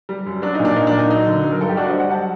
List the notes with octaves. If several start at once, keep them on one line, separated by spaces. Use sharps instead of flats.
G3
F#2
F#3 D4
D#4
A#2
D4
A#2 D#4
D4
A#2
D#4
F#3 D#4
D3
F#3
A#4
G2 A4
G4
G3 D4 F#4
C5 D#5
G3
D5 F#5
F#3 F#5 A5